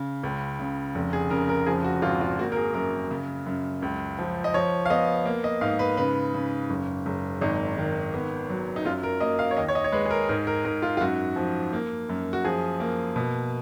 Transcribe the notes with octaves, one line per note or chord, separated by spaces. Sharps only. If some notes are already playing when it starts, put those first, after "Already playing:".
Already playing: C#3
C#2
C#3
F1
G#4
C#3 A#4
A#4
F3 G#4
F#4
G#1 F4
F4
A#3 F#4
A#4
G#4
F#2 A#4
C#3
F#2
C#2
F3
D#5
F3 C#5
F5
B3 D#5
A#3
D#5
G#2 F5
B4
C#3 B4
C#3
F#1
F#1
G#1 D#4
D#3
B3
F#3
D#4
F#2 F4
A#4
A#3 D#5
F5
C#5
D#2 D#5
C#5
D#5
C#5
G#3 B4
G#4
A#4
G#2 A#4
A#4
G#2 A#4
F4
F4
F#2 F#4
F3
A#3
F#2
F#4
F3 G#4
A#3
B2